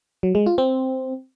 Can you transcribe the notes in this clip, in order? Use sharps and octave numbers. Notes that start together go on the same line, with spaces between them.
F#3
G#3
F4
C4